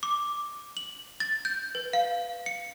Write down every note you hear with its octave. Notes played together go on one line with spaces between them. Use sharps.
D6
F#7
A6
G6
B4
F5
C#7